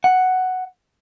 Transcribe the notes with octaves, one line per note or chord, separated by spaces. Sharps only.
F#5